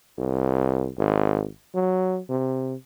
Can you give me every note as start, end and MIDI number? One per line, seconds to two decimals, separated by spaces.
0.18 0.89 36
0.98 1.47 32
1.75 2.19 54
2.30 2.75 48